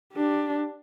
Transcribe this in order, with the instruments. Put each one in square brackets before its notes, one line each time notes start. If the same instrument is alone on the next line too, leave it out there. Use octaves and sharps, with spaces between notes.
[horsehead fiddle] D4 G4